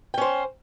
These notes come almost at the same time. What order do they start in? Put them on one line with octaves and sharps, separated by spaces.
G5 C#4 C5